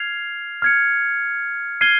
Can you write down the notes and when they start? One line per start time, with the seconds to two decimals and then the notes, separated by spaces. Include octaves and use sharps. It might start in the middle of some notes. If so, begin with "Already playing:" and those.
Already playing: F6 G#6 C7 F7
0.62 F6 G#6 C#7
1.81 F6 G#6 C7 D#7 G7